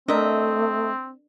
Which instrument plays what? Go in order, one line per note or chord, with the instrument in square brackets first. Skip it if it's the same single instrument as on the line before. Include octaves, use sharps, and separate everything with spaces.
[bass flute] A3 [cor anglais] C4 [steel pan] D4 A#4 [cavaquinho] D#5 E5